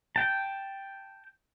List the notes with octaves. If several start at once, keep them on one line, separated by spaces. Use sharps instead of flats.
G5 A5